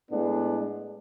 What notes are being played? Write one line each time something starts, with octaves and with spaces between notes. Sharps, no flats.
A2 G#3 B3 D4